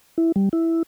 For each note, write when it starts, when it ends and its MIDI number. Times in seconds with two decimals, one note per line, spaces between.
0.18 0.32 64
0.36 0.49 55
0.53 0.83 64